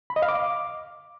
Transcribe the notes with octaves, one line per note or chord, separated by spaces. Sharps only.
B5
D#5
F5
D6